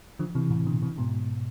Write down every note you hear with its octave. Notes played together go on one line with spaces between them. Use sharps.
D3 F3
C3 E3
A2 C3
B2 D3
C3 E3
G#2 B2